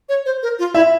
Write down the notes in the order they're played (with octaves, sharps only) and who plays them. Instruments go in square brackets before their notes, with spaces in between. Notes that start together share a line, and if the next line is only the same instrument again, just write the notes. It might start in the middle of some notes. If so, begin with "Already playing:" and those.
[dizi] C#5
C5
A#4
F4
[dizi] E4 [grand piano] E5